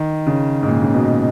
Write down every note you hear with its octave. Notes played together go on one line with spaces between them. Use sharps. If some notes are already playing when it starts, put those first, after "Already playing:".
Already playing: D#3
C#3
G#2
A#2
C#3
B2